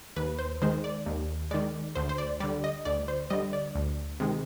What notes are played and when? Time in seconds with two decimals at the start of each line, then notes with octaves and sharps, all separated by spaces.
0.16 D#2 B4
0.39 C5
0.62 D#3 G#3 C5
0.84 D5
1.06 D#2
1.51 D#3 G#3 D5
1.95 D2 C5
2.09 C5
2.18 D5
2.40 D3 G3 D5
2.64 D#5
2.85 D2 D5
3.08 C5
3.30 D3 G3 D#5
3.53 D5
3.75 D2
4.20 C3 D#3 G#3